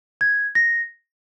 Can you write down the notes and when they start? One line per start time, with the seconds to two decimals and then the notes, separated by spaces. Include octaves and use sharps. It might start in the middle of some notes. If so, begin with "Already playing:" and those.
0.21 G#6
0.55 A#6